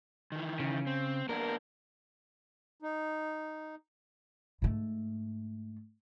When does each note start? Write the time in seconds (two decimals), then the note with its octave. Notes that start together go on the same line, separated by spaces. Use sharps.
0.32 D#3 E3
0.60 C#3
0.87 C4
1.29 A#3 B3 D4 A#4
2.82 D#4
4.62 G#2 A3